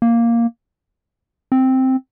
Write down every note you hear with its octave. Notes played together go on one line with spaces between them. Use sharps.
A#3
C4